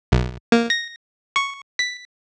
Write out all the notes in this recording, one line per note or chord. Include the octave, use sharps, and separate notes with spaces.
B1
A#3
A#6
C#6
B6